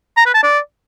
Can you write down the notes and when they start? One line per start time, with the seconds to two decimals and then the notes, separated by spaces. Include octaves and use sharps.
0.17 A#5
0.26 B4
0.34 A5
0.43 D5